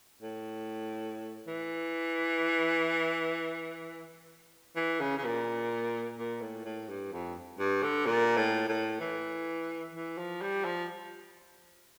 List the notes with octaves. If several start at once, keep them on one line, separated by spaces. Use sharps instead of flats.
A2
E3
E3
C#3
C#3
A#2
A#2
A2
A2
G2
F2
G2
D3
A#2
A2
A2
E3
E3
F3
G3
F3